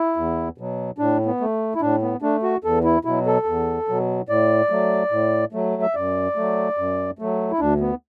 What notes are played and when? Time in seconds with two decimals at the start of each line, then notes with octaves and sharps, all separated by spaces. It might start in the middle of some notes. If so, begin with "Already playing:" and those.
Already playing: E4
0.16 E2
0.58 B2 F#3
0.98 A2 D4
1.26 B3
1.41 A3
1.75 E4
1.81 A2 D4
2.02 B3
2.22 A3 D4
2.43 F#4
2.64 E2 A4
2.84 E4
3.05 B2 F#3 E4
3.26 A4
3.46 E2
3.88 B2 F#3
4.29 A2 D5
4.70 F#3 A3
5.11 A2
5.53 F#3 A3
5.82 E5
5.95 F#2 D5
6.36 F#3 A3
6.78 F#2
7.19 F#3 A3
7.51 E4
7.59 D2 D4
7.80 B3